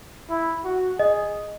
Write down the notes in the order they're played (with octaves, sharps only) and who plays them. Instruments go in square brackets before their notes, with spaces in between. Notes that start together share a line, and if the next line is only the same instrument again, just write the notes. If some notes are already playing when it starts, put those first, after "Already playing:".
[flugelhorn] E4
F#4
[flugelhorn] G#4 [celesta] D#5